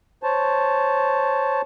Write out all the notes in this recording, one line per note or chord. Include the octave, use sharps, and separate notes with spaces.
C5 C#5 A5